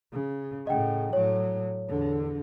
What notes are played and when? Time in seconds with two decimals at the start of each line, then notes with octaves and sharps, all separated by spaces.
0.13 C#3
0.67 A2 C#3 D#5 F#5 G5
1.13 A2 F#3 C#5
1.88 E2 D3